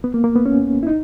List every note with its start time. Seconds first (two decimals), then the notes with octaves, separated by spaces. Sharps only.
0.04 B3
0.14 A#3
0.24 A#3
0.36 B3
0.46 C#4
0.83 E4
0.87 D#4